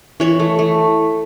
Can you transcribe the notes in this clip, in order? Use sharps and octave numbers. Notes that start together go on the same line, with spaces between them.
E3 C#5
A3
A3